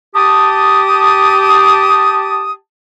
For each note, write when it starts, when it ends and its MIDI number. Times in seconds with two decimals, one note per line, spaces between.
0.15 2.52 67
0.15 2.52 81
0.15 2.52 87